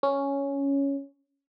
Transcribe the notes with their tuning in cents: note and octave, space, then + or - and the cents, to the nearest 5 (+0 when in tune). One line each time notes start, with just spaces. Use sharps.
C#4 +5